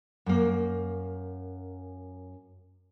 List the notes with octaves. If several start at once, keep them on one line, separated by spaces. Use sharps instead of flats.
F#2 A#3